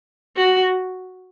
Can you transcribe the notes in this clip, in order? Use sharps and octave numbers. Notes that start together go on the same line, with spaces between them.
F#4